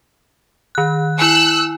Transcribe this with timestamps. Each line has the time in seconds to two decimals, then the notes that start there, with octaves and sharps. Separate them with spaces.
0.75 D#3 F#6
1.19 E4 G#5 E6 F#6